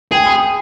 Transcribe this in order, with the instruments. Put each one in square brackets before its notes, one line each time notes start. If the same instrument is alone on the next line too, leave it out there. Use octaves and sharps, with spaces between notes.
[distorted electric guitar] G#4 [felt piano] G5